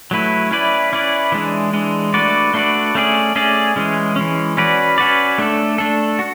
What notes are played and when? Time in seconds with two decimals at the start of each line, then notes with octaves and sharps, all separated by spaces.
0.11 F#3 A3 E4 B4
0.51 C#4 E4 B4 D5
0.93 C#4 E4 B4 D5
1.32 E3 G#3 D4
1.74 E3 G#3 D4
2.14 A3 D4 F#4 B4 D5
2.54 A3 D4 F#4 B4 D5
2.95 A3 C#4 G#4 D5
3.36 A3 C#4 G#4 D5
3.76 E3 G#3 C#4
4.16 E3 G#3 C#4
4.57 C#4 F#4 B4 D5
4.98 C#4 F#4 B4 D5
5.38 A3 D4 A4
5.78 A3 D4 A4
6.19 F#4